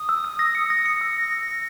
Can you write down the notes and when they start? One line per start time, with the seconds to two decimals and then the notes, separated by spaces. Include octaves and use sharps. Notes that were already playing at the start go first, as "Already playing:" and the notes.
Already playing: D#6
0.09 E6
0.24 E6
0.39 A#6
0.55 C#7
0.70 A#6
0.85 C#7
1.01 E6
1.16 A#6 C#7
1.33 C#7
1.48 C#7